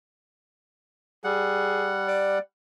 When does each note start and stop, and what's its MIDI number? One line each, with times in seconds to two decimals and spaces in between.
1.24 2.39 55
1.24 1.93 68
1.24 2.39 78
2.08 2.40 74